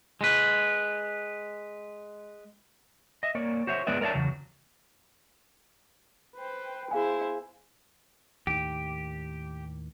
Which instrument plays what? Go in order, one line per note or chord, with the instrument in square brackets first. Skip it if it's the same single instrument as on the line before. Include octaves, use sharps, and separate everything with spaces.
[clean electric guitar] G#3 B4
[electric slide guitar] D#5 E5
A#3 C#5 D5
F#4 C5 C#5 E5
G#3 B3 B4 D5 E5
A#4 C#5 D5 E5 A5
E2 C#3 F#3
[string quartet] B4 C5 G5
[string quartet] B3 E4 C5 [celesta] G#4 F5 G#5
[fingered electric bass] D#2 A2 D#3 [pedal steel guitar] G4